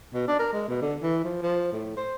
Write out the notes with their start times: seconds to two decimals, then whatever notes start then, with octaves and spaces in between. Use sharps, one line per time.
0.14 B2
0.28 D4
0.39 A#4
0.52 G#3
0.68 B2
0.81 D3
1.02 E3
1.24 F3
1.42 F3
1.72 A2
1.97 C5